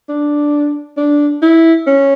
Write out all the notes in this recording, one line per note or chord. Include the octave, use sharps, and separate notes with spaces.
D4
D4
E4
C#4